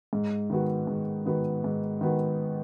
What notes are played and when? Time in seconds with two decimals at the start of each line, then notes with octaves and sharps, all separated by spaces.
0.13 G#2
0.50 D#3 B3 F#4
0.87 G#2
1.26 D#3 B3 F#4
1.64 G#2
2.01 D#3 B3 F#4